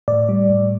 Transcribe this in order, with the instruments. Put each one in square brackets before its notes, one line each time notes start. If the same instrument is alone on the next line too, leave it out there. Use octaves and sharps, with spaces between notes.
[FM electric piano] A2 D5
G3
A2